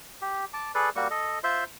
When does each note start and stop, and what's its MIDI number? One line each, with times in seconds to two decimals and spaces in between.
0.21 0.45 67
0.53 0.72 81
0.53 0.72 86
0.75 0.89 68
0.75 0.89 69
0.75 0.89 71
0.75 0.89 74
0.96 1.08 55
0.96 1.08 58
0.96 1.08 66
0.96 1.08 85
1.11 1.39 69
1.11 1.39 75
1.44 1.64 65
1.44 1.64 72
1.44 1.64 76
1.44 1.64 84